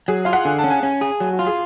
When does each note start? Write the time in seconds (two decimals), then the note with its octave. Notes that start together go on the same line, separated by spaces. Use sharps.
0.08 F#3 G#4
0.25 F4 F5
0.33 F#5
0.45 D3 G#5
0.58 A5
0.64 C#4
0.70 G#5
0.83 C#4 G#5
1.01 G#4
1.20 F#3
1.33 F#4
1.39 F4
1.46 G#4